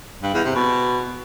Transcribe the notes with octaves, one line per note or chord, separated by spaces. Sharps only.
G2
E2
C3
B2